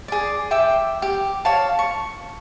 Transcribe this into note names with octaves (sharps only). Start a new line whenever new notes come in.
G#4 D5
E5 G5 D6
G4
C#5 F5 A5
C#6